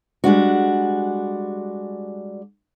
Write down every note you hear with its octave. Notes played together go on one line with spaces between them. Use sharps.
G3 G#3 D4 F#4